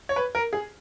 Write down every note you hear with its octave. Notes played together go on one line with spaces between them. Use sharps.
C#5
B4
A#4
G#4